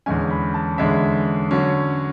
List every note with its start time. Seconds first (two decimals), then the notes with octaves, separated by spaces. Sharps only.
0.06 E2 D3 G#3 C#4 G#5
0.30 B5
0.54 A5
0.78 E2 D3 G#3 C#4 E5
1.51 D3 F#3 C#4